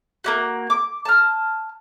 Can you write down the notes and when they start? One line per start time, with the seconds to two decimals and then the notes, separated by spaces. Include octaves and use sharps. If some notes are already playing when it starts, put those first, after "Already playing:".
0.24 A#3 C#4 F#4
0.70 D6
1.05 A5 F6